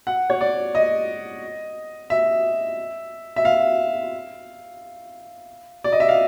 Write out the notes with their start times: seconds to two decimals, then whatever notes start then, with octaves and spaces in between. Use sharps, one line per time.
0.07 F#5
0.30 C#5
0.41 D5
0.75 D#5
2.10 E5
3.36 E5
3.45 F5
5.84 D5
5.92 D#5
6.00 E5
6.09 F5